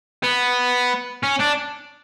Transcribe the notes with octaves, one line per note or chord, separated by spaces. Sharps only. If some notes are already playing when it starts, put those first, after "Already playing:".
B3
C#4
D4